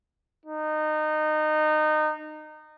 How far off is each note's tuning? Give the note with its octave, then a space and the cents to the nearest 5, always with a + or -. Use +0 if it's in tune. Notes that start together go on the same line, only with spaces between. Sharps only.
D#4 -20